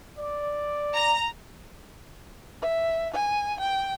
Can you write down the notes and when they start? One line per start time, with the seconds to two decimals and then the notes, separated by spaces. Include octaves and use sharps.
0.19 D5
0.94 A#5
2.62 E5
3.14 G#5
3.60 G5